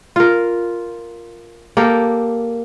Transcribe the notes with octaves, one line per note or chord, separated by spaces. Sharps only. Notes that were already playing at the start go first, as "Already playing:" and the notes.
F4 A#4
A#3 G4 A4 A#4